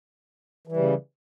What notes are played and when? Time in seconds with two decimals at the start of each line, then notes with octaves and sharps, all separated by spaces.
0.67 E3
0.72 G3
0.77 C#3